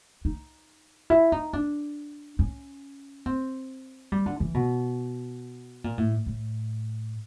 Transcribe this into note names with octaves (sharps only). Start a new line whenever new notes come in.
D#4
E4
D#4
D4
C#4
C4
G3
D3
E3
B2
A#2
A2
A2